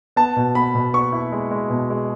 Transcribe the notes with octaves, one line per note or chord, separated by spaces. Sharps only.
B3 A5
B2
B3 B5
B2
B3 C#6
E4
G#3
G#3
B2
G#3